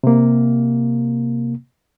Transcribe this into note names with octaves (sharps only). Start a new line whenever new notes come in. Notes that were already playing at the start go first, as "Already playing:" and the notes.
C3 A#3